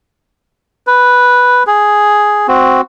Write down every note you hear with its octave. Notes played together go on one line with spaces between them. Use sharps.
B4
G#4
C4 F#4